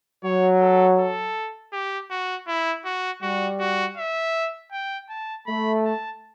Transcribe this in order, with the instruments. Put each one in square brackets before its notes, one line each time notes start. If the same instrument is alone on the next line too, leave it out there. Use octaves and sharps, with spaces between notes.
[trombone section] F#3 [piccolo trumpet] C#5
[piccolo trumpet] A4
A4
G4
F#4
E4
F#4
[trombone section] G3 [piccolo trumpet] F#4
[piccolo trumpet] F#4
E5
G5
A5
[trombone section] A3 [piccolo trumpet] B5
[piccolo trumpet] A5